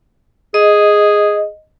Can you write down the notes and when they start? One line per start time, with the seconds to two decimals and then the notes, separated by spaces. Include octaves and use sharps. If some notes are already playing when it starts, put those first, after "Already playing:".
0.54 G#4 D#5